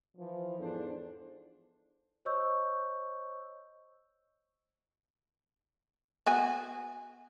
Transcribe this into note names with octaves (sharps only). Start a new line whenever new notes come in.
E3 F3
E2 G#2 D4 A4 C5
C5 C#5 D#5 C#6 E6 G6
B3 F#4 G#5